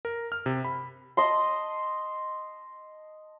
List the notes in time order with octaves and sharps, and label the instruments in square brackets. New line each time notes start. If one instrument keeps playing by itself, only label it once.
[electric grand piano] A#4
F6
C3
B5
[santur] D#5 A5 C6